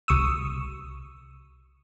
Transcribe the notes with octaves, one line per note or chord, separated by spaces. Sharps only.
C2 C#6 D#6 E6